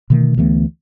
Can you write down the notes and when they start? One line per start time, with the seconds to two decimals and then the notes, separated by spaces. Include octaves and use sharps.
0.10 B2 D3 D#3 A3
0.38 D2 E3 A3 B3